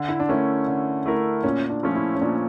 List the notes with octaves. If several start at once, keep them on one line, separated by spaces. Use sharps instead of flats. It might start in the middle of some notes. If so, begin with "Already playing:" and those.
Already playing: D3
E4
D4
A3 C#4 E4 A#4
D3
A3 E4 A#4
A#2 C#4
D4
F3 A3 C#4
E4
C#4
A#2 D4